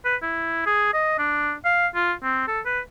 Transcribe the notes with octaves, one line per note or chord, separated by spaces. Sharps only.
B4
E4
G#4
D#5
D4
F5
F4
C4
A4
B4